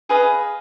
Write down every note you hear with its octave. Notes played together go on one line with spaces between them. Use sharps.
G#4 B4 D#5 F5